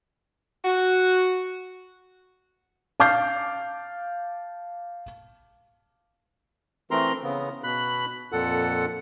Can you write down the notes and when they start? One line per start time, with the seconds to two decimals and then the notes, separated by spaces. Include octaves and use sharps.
0.65 F#4
3.00 F5 A5 D6 F6 G6 C7
6.91 E3 A3 C4 A#4 A#5 C6
7.23 C#3 B3
7.64 B2 B5 F#6
8.32 F2 A#2 A4 F#5